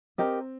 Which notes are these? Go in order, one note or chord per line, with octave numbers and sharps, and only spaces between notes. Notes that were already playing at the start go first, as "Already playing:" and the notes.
C4 G4 A#4 D#5